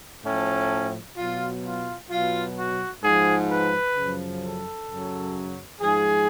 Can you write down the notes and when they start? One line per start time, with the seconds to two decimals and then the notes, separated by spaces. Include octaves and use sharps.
0.25 A2 F3 C#4
1.17 B2 F#3 F4
1.64 F4
2.10 B2 F#3 F4
2.57 F#4
3.03 G#2 F3 G#4
3.49 B4
3.96 F#2 C#3 F3
4.42 A4
4.88 F#2 C#3 F#3
5.81 G#2 F3 G#4